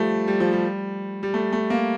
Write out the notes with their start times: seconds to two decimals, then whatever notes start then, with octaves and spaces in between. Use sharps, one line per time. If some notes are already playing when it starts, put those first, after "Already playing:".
Already playing: F3 G3 A3
0.28 G3
0.40 F3
0.53 G3
1.23 G3
1.34 A3
1.53 A3
1.70 A#3